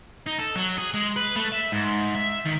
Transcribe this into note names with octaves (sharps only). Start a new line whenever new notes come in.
D#4
A4
F#3
G#4
G#3
B4
A3
E5
G#2
E5
D#3